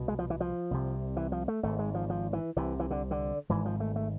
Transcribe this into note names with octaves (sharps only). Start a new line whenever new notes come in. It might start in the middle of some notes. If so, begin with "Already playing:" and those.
Already playing: C2 B2
G#3
F3
E3
F3
C2 C3
E3
F3
A3
G#1 G#2 A3
G#3
F3
F3
E3
C2 C3 E3
E3
D3
D3
G#1 G#2 E3
F3
A3
A3